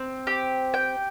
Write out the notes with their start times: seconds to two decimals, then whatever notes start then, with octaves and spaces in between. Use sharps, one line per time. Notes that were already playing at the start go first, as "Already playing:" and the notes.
Already playing: C4
0.27 G4
0.74 G5